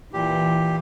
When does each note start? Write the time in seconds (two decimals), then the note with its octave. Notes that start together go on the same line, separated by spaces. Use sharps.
0.13 A#2 E3 G4